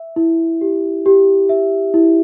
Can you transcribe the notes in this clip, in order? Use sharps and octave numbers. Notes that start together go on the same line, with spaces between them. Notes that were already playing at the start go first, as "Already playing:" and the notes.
Already playing: E5
E4
G4
G4
E5
E4